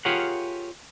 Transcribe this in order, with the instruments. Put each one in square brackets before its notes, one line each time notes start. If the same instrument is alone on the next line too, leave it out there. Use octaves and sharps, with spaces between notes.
[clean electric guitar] F4 G4 G#4 A#4 C#5 F#5